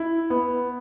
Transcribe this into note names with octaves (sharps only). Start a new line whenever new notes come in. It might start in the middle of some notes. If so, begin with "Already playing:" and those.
Already playing: E4
B3